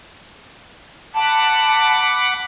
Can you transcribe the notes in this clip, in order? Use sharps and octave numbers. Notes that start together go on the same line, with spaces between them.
F#5 A5 B5 D6